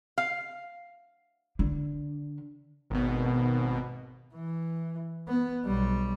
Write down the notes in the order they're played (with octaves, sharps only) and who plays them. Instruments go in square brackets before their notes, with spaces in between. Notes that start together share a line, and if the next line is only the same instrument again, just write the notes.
[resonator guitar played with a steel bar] F5
[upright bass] D3
[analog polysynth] G#1 B2
[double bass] E3
B3
B1 G3